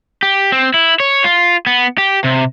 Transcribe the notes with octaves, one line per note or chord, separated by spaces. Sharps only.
G4
C4
E4
C#5
F4
B3
G4
C3